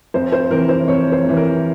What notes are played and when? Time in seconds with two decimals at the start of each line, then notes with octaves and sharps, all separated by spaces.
0.14 F2 C5
0.33 C5
0.51 C3 E3 A#4
0.69 C5
0.88 F2 C#5
1.12 C5
1.25 C3 E3
1.37 A#4